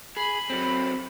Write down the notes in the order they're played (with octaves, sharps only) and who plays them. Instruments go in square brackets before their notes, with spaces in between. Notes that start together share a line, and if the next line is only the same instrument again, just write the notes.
[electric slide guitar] G#4 [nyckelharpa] B5
[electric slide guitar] F#3 C4